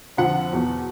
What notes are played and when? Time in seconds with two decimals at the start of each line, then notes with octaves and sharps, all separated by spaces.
0.17 F2 D3 F3 F#5
0.51 E2 B2 F#3